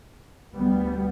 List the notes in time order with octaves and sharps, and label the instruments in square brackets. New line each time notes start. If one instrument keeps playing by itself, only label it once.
[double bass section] D2 G3 B3